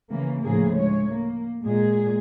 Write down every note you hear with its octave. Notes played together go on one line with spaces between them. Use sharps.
C#3 E3 A#3
D2 A2 C#3 F3 A#3 G#4
G#3 C#5
A#3
A#2 G#3 G#4